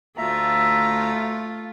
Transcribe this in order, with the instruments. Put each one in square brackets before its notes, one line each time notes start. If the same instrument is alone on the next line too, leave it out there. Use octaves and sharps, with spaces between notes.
[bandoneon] D2 E5 A#5 [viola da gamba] A3 F4